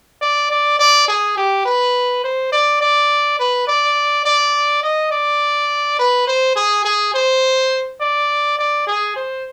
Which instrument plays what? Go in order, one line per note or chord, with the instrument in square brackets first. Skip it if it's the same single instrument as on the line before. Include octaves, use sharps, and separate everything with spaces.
[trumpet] D5
D5
D5
G#4
G4
B4
C5
D5
D5
B4
D5
D5
D#5
D5
B4
C5
G#4
G#4
C5
D5
D5
G#4
C5